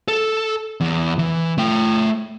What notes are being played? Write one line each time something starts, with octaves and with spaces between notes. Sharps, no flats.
A4
E2
E3
A3 G5